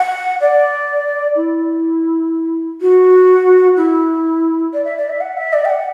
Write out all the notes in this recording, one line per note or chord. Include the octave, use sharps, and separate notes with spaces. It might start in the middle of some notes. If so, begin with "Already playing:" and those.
Already playing: F#5
D5
E4
F#4
E4
D5
E5
D5
E5
F#5
E5
D5
G5
F#5